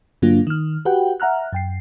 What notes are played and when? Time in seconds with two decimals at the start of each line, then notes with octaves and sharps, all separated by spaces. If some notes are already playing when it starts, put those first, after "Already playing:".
0.22 G2 D3 F#3 A#3 D4 F4
0.47 D#3 F6
0.85 F#4 G4 B4 F#5 G5
1.20 E5 F#5 A#5 F6 F#6
1.53 F#2 G5 C7